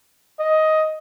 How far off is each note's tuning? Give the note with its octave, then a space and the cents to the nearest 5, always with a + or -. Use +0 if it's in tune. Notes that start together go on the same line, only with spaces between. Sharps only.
D#5 +10